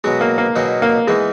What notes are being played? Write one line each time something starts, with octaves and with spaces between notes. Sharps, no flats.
B2 F#3 G#3 B3 F#4
A#3
A#3
B2 F#3 B3 D#4 G#4
A#3
E3 G#3 B3 D#4